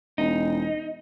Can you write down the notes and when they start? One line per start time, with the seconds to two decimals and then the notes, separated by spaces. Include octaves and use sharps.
0.18 E1 D#4